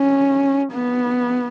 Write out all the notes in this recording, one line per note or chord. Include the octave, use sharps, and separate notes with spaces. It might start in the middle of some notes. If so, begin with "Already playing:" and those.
Already playing: C#4
B3